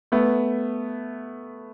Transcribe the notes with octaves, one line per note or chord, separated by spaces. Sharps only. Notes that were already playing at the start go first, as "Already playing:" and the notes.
A3 B3